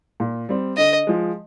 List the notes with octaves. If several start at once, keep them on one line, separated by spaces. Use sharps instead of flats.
A#2
G3 C4
D3 D#5
F3 G#3